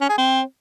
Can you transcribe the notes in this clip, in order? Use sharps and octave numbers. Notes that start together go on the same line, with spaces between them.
C#4
G#4
C4